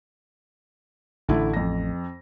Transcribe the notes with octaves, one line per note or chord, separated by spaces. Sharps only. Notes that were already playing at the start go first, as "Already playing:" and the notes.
A1 D3 A3 E4
F2 A#6